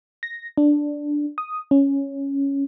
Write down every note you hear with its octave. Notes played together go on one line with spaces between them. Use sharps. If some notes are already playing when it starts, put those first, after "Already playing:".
A#6
D4
D#6
C#4